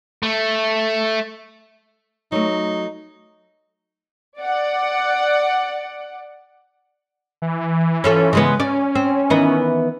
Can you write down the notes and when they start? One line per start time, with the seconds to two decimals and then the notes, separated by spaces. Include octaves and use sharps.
0.23 A3
2.32 F#3 A3 D#4
4.38 D5 F#5
7.42 E3
8.04 C#4 F4 A4
8.33 C#3 G#3 B3
8.60 C#4 D5
8.95 C4
9.30 D#3 E3 B3